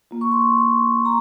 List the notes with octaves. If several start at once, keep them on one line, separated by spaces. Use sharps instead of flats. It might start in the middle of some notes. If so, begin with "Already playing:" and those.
A#3 F4
C#6
C6
C#6
C6
A#5